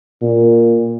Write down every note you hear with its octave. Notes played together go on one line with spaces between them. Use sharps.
A#2